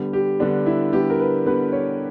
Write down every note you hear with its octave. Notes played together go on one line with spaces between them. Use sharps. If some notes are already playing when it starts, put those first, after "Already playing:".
Already playing: D3 G3 B3
G4
D3 G3 B3 D4
E4
D3 G3 B3 G4
A#4
B4
D3 G3 B3 B4
C#5